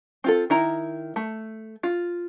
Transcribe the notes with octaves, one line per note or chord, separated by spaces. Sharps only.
C4 F4 A4
D#3 E4 A#5
A3
F4